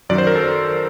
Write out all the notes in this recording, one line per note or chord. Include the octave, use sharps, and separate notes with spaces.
F#2 D#3 F#3 D5
C5
A#4
A4